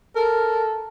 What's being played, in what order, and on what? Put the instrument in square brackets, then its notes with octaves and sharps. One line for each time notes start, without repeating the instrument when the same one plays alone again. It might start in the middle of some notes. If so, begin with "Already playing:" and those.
[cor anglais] A4 [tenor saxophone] A#4